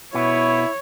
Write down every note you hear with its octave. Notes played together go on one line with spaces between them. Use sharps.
B2 B3 E4 C#5